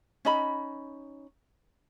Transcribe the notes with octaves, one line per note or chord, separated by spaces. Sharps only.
C#4 D#4 D#5 B5